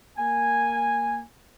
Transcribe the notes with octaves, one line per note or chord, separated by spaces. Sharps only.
A#3 G#5